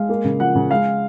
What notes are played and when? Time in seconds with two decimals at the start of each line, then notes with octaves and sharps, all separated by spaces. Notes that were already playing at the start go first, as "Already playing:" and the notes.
Already playing: G#3 F5
0.09 A#3
0.24 C#3
0.40 F3 F#5
0.55 C#3
0.71 G#3 F5